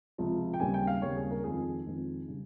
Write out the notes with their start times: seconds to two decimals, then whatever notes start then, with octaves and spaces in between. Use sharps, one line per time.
0.18 C#2 C3 F3
0.54 G5
0.60 D#2 C#3 G3 C4 G#5
0.74 G5
0.87 F5
1.02 D#2 C#3 G3 C4 C#5
1.16 G#4
1.31 A#4
1.44 F2 D#3 G#3 C4 G#4
1.86 F2 D#3 G#3 C4
2.28 C#3 G3